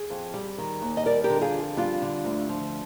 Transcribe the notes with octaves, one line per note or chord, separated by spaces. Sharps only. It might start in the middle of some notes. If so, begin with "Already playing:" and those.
Already playing: G#4
F2
G3
D#3
D#2
D#5
G3 A#4 D5
G4 A#4
D3
F4 G#4
F2
G3 D4 F4
D3
D2
F3